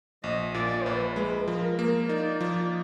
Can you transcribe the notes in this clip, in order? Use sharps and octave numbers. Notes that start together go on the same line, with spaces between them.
A#1 D#5
A#2 D5
A#1 B4
G#3
F3 A#4
A#3
D#4 D5
F3